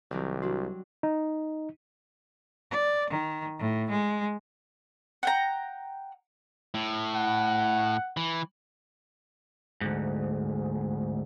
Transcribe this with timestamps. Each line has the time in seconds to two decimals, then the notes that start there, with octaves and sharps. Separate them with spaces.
0.11 C2 C3 D#3 F#3
0.42 F#3 G3 D4 F#4
1.03 D#4
2.71 D5
3.10 D#3
3.59 A2
3.90 G#3
5.23 F#5 G5 A#5
6.74 A2
7.16 F#5
8.17 E3
9.81 D2 G#2